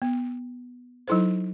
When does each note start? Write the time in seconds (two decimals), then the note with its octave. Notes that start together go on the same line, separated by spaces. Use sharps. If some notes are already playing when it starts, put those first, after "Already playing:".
0.02 B3
1.08 F#3 D#4 E4 A4 C5